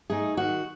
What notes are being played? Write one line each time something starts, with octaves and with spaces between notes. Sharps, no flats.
A3 D#4 G#4
D#3 F#4